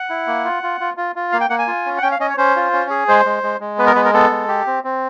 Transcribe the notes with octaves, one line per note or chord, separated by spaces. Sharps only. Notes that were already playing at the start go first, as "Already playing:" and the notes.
Already playing: F#5
E4
A#3
F4
F4
F4
F4
F4
A#3 F5
G5
A#3 F#5
G#5
F4
C#4
F#5
C#4 G5
F5
C#4 D#5
C#5
C#4 C5
F4
C#4
G#4
G#3 C5
G#3
G#3
G#3
B3 B4
A#4
G#3 B4
A#4
B3 A4
G#3
G4
C4
C4